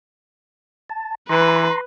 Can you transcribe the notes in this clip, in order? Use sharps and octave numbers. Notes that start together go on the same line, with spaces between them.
A5
E3 B4 A#5 C6